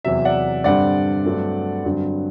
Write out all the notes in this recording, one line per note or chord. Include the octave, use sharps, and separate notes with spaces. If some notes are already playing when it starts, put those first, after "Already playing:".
E2 C3 F#3 E5
D5 F#5
G2 D3 G3 C4 D5 F#5
G2 F#3 A3 C4
G2 D3 F#3 C4